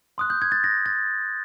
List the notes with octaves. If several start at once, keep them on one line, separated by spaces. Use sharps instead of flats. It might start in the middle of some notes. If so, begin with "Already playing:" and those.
C6 D#6 F#6
G6
G#6
A6
A#6
A6